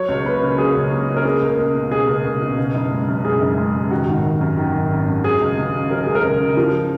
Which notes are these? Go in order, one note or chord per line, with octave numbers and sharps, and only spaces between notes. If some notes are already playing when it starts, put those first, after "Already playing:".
Already playing: F#3 C#5
C#2
A#3 B4
C#3
F#3 G#4
C#2
A#3
C#3
A#4
A#3 G#4
C#2
C#2
B2
A#3 G#4
C#2
C#2
B2
C#3
F#1
G#3
F#2
C#3 G#4
F#1
G#3
F#2
D#3 F#4
G#1
G#1
F#2
D#3
G#1
G#1
F#2
F#3 G#4
C#2
C#2
C#3
F#3 A#4
C#2 G#4
A#4
C#2
C#3
F3